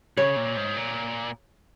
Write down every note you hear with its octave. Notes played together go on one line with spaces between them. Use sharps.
C#3 C#5
A#2
G#2
A#2